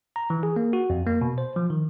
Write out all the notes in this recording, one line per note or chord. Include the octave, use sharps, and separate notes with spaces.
A#5
E3
G#4
A#3
F#4
F2
A#3
B2
C5
F3
D#3